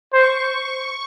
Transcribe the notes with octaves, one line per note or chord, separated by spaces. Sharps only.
C5 C#6